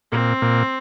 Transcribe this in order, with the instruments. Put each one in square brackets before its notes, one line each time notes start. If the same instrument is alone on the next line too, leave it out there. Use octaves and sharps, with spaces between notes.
[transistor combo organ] A#2 [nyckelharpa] C4
[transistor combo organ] A#2